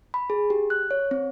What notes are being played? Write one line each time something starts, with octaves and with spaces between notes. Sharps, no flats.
B5
G#4
G4
F#6
C#5
C4